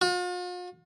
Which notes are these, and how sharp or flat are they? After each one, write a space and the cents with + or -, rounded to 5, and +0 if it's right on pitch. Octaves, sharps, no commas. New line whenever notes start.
F4 +45